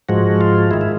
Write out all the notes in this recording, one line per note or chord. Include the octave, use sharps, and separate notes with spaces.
G#2 F3 G#3 F#4
F4
D#3 G#3 E4
E4